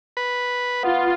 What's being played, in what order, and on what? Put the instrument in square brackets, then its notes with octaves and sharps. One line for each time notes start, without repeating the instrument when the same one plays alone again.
[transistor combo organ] B4
[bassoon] B3 [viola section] F4